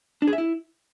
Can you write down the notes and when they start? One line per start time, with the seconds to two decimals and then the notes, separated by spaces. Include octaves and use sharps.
0.22 D4
0.27 G#4
0.33 E5
0.38 E4